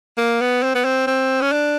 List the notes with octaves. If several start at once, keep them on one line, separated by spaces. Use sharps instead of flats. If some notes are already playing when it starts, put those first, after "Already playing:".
A#3
B3
C4
B3
C4
C4
C#4
D4